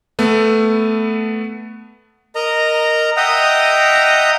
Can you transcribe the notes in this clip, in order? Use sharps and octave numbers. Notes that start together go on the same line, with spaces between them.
A3 B3
A#4 D#5 A#5
D#5 E5 F#5 G5 A#5 D#6